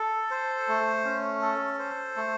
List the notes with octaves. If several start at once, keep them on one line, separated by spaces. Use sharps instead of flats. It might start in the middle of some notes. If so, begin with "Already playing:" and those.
Already playing: A4
C5
A3
C#4
A4
C5
A3